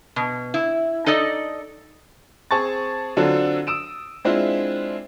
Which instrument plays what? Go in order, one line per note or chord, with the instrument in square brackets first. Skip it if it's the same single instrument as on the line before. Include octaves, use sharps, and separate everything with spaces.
[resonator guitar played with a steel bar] B2
E4
D#4 A4 D5 D#5
[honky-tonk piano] C4 G#4 A5 C#6 A6
D3 F#3 C4 D4 F4 A4
D#6 E6 D7 E7
G#3 C4 D4 E4 F4